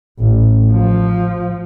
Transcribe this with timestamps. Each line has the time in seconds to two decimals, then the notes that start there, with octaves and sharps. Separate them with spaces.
0.19 A1
0.71 F3